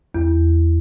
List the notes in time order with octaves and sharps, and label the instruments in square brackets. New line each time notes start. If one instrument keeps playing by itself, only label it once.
[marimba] E2